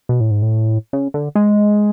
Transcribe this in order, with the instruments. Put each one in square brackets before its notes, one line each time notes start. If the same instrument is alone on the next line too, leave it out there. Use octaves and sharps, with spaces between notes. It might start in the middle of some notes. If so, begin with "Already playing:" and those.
[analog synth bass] B2
A2
G#2
A2
C#3
D3
G#3